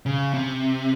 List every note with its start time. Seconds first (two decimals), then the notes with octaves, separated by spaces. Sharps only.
0.06 C#3
0.34 C3